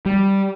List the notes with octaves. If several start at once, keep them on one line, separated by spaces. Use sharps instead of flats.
G3